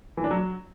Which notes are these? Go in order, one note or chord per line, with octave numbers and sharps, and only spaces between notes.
E3
D4
F#3